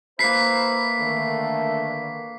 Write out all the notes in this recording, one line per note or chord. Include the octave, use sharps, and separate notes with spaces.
A#3 E4 B4 C5 B5 B6 C7
D3 D#3 A3